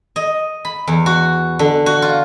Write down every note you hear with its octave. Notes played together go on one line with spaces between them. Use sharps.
D#5
B5
E2
F#4
D3
F#4
F4